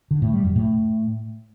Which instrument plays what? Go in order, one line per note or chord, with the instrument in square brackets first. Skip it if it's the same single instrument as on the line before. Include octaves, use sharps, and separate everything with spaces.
[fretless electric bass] D3
A2
G3
F#2
A2